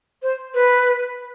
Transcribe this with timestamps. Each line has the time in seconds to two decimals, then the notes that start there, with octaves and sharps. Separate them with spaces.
0.22 C5
0.54 B4